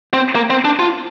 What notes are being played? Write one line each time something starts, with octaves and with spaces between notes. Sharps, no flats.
C4
A#3
C4
D4
F4